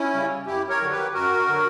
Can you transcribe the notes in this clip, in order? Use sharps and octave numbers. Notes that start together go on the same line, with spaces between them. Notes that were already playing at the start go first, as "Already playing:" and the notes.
Already playing: C#4 E4
C#3 G3
F#2 E4 G4
A#4 C#5
D3 F#3
G4 B4
F#2 F#4 A#4
D3 F#3